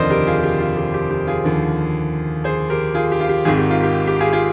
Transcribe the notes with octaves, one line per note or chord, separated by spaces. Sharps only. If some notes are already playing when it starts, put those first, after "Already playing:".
Already playing: F1 D#2 D3 F3 A#4 C5 D5 D#5
G4 A#4
F4 G#4
G4
F4
G4
G4
G4
F4 G#4
D#2 D3 F3
G#4 C5
G4 A#4
F4 G#4
G4
F4
G4
G#1 G#2 D#3 F4 G#4
G4
F4
G4
G4
F4 G#4
F4 G#4